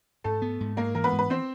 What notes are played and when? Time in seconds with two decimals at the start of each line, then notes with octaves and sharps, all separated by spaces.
0.24 G#2 A3 A4
0.42 B3
0.60 G#2
0.77 G#3 A#3 A#4
0.95 E3 A#4
1.04 B3 B4
1.13 G#2
1.19 B4
1.30 C4 C5